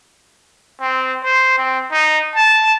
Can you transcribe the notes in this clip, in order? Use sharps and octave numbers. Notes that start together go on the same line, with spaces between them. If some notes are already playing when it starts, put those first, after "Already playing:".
C4
C5
C4
D#4
A5